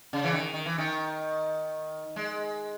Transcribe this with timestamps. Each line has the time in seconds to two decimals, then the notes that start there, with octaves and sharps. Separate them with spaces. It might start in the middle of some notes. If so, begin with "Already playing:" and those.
0.13 C#3
0.24 E3
0.33 D#3
0.53 D#3
0.66 E3
0.78 D#3
2.16 G#3